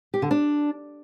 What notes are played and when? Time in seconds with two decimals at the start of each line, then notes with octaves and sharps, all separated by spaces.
0.14 G4
0.22 D3
0.31 D4